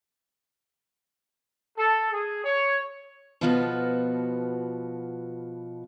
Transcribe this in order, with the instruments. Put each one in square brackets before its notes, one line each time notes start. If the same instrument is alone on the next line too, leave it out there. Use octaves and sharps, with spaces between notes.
[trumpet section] A4
G#4
C#5
[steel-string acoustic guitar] B2 F3 B3 F4 F#4 A4